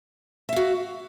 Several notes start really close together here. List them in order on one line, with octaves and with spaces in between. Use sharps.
E5 F5 F#4